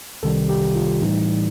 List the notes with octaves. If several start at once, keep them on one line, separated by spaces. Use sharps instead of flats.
C2 C3 D#3 G3 A4
G4
F4
A2 E3 G3 D#4